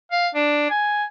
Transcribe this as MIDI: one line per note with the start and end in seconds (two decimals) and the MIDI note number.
0.12 0.28 77
0.35 0.70 62
0.70 1.04 80